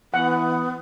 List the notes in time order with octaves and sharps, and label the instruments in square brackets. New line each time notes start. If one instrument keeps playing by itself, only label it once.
[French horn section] E3 [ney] B3 [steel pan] F#5